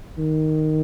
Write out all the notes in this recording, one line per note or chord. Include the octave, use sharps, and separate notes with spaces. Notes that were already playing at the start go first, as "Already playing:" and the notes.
D#3